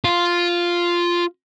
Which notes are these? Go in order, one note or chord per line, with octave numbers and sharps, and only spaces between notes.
F4